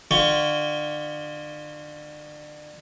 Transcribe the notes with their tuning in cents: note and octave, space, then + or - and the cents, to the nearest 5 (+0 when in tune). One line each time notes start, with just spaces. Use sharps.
D3 +35 F4 +0 C#6 +20